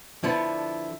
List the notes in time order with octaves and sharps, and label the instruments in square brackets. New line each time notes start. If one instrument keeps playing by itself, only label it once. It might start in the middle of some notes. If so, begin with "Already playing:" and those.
[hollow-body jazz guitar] D3 F3 B3 [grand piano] E4